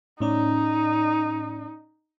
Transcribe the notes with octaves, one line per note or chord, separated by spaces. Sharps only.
A2 C#4 D#4 D5